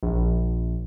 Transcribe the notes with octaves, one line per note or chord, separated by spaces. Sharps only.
A#1